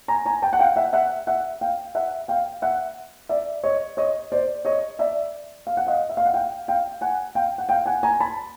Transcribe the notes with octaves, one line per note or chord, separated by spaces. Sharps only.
G#5 A#5
G#5 A#5
G5 A5
F#5
F5 G5
E5 F#5
E5 F#5
E5 F#5
F5 G5
E5 F#5
F5 G5
E5 F#5
D5 E5
C#5 D#5
C#5 D#5
C5 D5
C#5 D#5
D5 E5
F5
F#5
D#5 F5
E5
F5
F#5
F5 G5
F5 G5
F#5 G#5
F5 G5
F#5
F5 G5
F#5 G#5
G#5 A#5
A5 B5